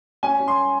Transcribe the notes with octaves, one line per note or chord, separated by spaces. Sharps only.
C#4 G#5
C#4
C6